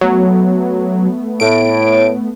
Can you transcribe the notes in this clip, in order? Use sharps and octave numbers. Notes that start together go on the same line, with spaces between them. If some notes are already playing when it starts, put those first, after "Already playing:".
F#3 A3 B3
A2 D7